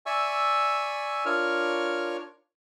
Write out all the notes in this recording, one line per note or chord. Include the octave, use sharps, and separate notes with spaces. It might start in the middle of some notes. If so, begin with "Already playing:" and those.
D5 E5 G#5 C#6 E6
D4 F4 A#4 C#5 C#6 F6